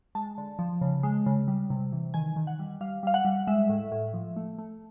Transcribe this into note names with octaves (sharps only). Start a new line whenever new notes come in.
G#3 A5
D3
F3
C#3
G#3
C#3
G3
C3
E3
D#3 G#5
D#3
F#5
G3
G3 F5
G3 F5
F#5
G3
G#3 E5
A2
A2
F3
A3
A3